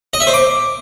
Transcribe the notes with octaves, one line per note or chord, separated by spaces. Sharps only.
D#5
E5
C5
D6